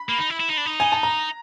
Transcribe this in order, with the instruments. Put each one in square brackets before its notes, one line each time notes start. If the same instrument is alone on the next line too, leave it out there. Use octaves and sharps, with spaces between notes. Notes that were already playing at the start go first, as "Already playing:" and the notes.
Already playing: [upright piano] B5
[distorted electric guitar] A#3
D#4
E4
E4
D#4
D4
D#4
[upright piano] G#5
A5
A#5